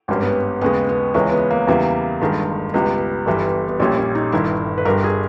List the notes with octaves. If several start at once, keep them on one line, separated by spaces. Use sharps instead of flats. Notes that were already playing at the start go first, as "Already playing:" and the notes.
G#1 G2 G3 C#4
B3
D#2 C#3 G#3 B3
B3
C#2 C#3 E3 G#3 C#4
B3
A#3
E2 C#3 E3 G3 A#3
G1 G2 D#3 G#3
C#2 C#3 G3 B3
G1 G2 E3 G3
B3
A#1 A#2 G3 C#4
C#4
D#4
G1 G2 D#3 E4
B4
G1 G2 G3 A#4
G#4